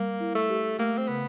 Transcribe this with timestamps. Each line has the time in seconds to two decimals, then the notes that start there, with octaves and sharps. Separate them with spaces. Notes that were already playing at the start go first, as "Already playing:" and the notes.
Already playing: G3 A#3
0.20 E4
0.35 A3
0.49 G4
0.79 A3 A#3
0.98 C4
1.08 C#3 B3